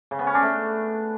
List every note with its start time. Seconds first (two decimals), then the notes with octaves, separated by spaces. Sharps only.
0.11 C#3
0.19 B3
0.27 C#4
0.34 D4
0.42 A3